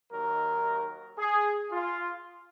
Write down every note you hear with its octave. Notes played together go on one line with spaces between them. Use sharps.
D#2 D#3 F#3 A#4
G#4
F4